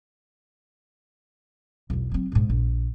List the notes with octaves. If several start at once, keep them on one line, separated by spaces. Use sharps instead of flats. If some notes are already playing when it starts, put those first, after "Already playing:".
B1 E2
F#3 C4
A#1 G#2
A#1